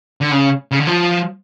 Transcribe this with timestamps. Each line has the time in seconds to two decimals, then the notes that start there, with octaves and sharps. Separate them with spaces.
0.21 D3
0.32 C#3
0.71 C#3
0.79 D3
0.87 F3